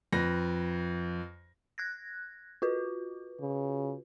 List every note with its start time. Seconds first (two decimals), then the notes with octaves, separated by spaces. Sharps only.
0.12 F2 B4 A#6
1.78 F#6 G#6 A#6
2.62 F4 F#4 B4
3.41 C#3